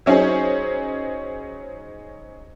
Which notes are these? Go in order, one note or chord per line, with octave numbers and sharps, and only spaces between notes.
F#3 C#4 D#4 G#4 C5